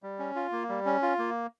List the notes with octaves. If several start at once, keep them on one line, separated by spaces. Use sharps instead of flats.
G3
C#4
F4
A#3
G3
C#4
F4
A#3